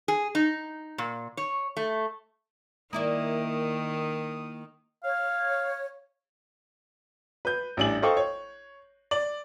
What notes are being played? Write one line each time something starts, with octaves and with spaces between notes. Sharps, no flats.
G#4
D#4
A#2
C#5
A3
D#3 A#3 E4 D5 D#6
C#5 F5
B4 G6
A1 G3 D4 G#5 F#7
A4 C5 D#5 F5 G5 C#6
C#5
D5 F#7